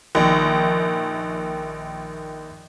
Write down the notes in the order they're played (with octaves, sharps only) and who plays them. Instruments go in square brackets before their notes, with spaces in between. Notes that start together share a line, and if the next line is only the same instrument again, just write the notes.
[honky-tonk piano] A#1 [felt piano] D#3